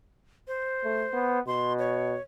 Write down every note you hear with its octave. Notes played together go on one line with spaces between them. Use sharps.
C5
A3
B3
B2 C6
C#5